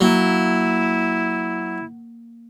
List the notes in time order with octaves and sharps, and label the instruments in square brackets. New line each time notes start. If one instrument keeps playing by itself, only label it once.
[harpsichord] F#3 [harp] A#3 [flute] E4